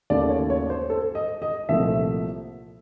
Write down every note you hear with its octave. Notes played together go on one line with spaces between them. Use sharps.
D#2 C#3 F#3 A3 D5
C#5
C#5
C5
A4
D#5
D#5
C2 A#2 F3 A3 E5